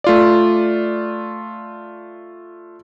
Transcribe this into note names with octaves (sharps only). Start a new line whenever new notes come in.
A3 F4 D5